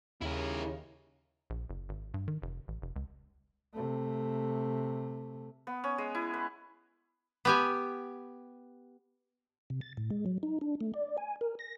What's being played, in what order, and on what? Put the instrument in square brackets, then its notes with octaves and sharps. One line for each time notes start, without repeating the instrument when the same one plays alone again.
[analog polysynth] D#2 [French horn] C#3 [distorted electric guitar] E4 A#4
[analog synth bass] A#1
F#1
G#1
G2
D#3
F1
A1
F1
C#2
[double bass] C3 A3
[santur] B3
C#4
G#3
E4
B4
[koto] B3 G4 G#5
[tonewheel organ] C3
A6
A2
G#3
F#3
D#4
D4
A3
D5
G#5
A#4
A#6